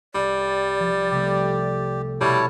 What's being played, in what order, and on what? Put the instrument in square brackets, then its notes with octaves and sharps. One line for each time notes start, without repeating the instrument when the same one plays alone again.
[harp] C2 [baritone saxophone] G3 [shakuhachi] D5
[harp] F3
[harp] C3 A3 [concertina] G4
[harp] B2 F6 A6 [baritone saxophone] G3 [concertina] E4 C#5 A5